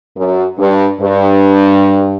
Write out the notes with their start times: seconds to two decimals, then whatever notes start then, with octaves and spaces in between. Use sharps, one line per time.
0.17 F#2
0.59 G2
1.01 G2